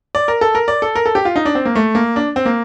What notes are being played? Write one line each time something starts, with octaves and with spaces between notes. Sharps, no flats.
D5
A#4
A4
A#4
D5
A4
A#4
A4
G4
F4
D#4
D4
C4
A#3
A3
A#3
D4
C4
A#3